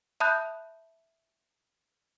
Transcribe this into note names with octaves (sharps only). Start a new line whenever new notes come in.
E5 A5 B5 D#6 F#6 G6